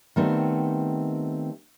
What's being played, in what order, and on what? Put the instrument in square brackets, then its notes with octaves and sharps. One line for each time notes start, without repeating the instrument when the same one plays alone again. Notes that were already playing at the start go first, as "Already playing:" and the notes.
[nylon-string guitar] D#3 G3 A3 B3 C4